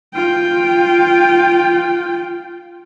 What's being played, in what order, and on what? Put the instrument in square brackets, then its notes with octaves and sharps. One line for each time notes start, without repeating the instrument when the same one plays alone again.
[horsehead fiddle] F4 G5